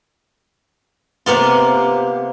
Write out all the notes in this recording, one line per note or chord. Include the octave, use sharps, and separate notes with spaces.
C3 A#3 B3 F4